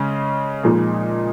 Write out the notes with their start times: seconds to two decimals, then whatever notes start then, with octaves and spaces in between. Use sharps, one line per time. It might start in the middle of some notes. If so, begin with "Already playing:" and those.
Already playing: C#3 G#3 C#4
0.63 A#2 F3 G#3 D#4